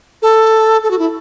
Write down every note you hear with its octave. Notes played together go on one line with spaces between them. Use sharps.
A4
A4
F#4
E4